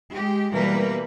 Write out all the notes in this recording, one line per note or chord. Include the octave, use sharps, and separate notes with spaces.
G#3 G4
B2 E3 G3 A#3 A#4 B4